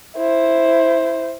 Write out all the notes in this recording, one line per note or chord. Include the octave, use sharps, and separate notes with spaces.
E4 C5